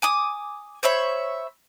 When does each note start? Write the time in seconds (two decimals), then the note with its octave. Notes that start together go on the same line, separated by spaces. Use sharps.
0.02 G#5 D6 D#6
0.83 C5 C#5 E5 B5